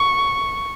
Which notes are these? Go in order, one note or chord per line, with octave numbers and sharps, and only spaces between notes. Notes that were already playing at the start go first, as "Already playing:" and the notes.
Already playing: C#6